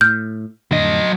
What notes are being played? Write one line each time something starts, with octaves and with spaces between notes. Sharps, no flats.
A2 F6 G6
F2 A2 D3 F#3 D#5